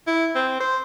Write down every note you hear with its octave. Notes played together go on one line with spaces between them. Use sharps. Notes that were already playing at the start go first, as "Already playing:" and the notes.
E4
C4
C5